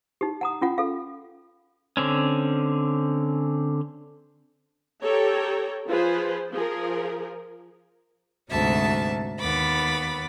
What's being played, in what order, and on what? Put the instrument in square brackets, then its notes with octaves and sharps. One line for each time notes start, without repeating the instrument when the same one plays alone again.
[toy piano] D#4 G4
F#5 A#5 D#6
C#4 F4 F#5
A4 F5
[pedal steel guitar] D3 C4 C#4
[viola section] G4 A4 C#5 G5 A#5
F3 F4 G#4 B4 C5
F3 G#4 A#4
[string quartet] D2 G#2 C3 F#3 E5 A5
D#2 B3 B5 D6 A6